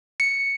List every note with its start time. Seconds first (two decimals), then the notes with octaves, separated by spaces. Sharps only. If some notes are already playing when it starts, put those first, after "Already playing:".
0.20 C#7